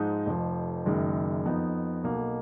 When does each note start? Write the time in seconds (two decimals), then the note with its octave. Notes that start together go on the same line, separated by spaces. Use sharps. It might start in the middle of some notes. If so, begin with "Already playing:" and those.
Already playing: G#2 F3 G#3 D#4
0.26 F1 F2 F3
0.85 F#1 F#2 D#3 G#3
1.45 F2 F3 B3 D#4
2.03 B1 B2 A#3